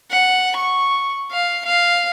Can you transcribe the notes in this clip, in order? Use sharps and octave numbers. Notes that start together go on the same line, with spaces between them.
F#5
C#6
F5
F5